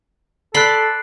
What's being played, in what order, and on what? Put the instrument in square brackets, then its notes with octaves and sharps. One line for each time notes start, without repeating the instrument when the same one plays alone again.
[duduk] A4 [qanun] D5 B5 C6 [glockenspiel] F#6 C7